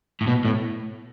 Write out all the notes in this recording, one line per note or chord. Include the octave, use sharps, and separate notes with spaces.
A2
B2
A2